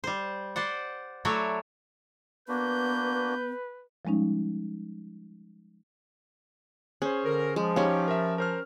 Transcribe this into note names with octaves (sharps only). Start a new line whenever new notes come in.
G3 C5
C5 D5 F#5
F#3 A3 E4 F#4 C#5 D5
A#3 B3 D4 F#4 B4 G6
F3 G3 G#3 C#4 D#4
C#4 G#4 C5
D3 A#4
F3 G#3
C#4 D#4 G4 C#5 F5
A#4 E5
A#4 C5 F6